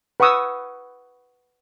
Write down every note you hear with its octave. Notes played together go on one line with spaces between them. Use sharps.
B4 F#5 B5 C#6 D#6 E6